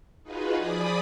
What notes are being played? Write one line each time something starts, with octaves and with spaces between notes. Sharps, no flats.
D#4 F4 F#4 G#4 B4
F3 G#4 D5 B5 D#6